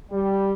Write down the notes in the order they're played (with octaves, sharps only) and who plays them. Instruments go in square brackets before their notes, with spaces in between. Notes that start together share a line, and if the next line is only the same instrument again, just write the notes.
[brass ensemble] G3